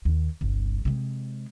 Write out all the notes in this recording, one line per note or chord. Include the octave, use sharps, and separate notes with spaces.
D#2
G1 C2
C3 G#3